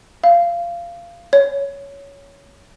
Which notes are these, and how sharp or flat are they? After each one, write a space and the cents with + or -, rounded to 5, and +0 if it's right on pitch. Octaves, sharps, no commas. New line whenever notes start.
F5 -20
C#5 +10